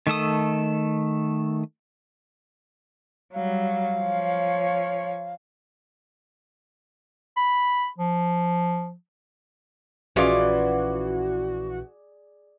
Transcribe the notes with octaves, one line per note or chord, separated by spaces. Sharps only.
D#3 A3 A4 D#6
F#3 G3 F5
F3 C#5
B5
F3
A#1 E3 C#4 F4 F#4 G#4 D5 D6